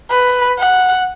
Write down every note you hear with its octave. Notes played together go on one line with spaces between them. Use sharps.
B4
F#5